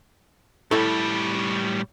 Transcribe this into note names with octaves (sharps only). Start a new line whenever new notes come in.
A2 G3 E4 A4